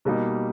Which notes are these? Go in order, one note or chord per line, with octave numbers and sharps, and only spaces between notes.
B2 G3 A#3 D#4